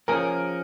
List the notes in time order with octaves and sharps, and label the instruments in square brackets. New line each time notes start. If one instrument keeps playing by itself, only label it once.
[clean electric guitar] F3 A#3 C#4 G#4 [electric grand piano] A#4